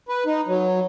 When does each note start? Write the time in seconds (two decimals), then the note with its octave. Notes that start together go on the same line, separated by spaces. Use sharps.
0.09 B4
0.26 D#4
0.47 F#3